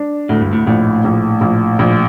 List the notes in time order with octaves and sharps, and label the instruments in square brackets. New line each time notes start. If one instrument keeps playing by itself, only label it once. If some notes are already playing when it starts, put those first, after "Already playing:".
Already playing: [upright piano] D4
[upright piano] D2 [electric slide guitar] A2
[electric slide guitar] G2
A2
[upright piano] A#1 [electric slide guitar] A2
[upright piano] A#1
A#1
A#1